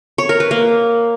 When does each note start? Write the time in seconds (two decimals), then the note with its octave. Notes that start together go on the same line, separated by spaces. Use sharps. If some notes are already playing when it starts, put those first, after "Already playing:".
0.18 C#5
0.29 A#4
0.40 B4
0.51 A#3